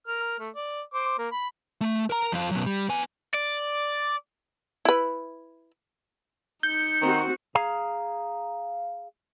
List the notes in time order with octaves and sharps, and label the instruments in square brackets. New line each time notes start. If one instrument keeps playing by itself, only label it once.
[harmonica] A#4 F6
A3
D5
C5 D6
A#3 A#4
B5
[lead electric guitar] A3
A#4 A#5
F2 F4
F#2 B2
G3
B3 G#5
[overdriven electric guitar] D5
[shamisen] E4 B4
[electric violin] D#4 C#7 [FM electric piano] G6
[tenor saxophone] D#3 [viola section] C4 F#4
[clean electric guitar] G#4 F5 A#5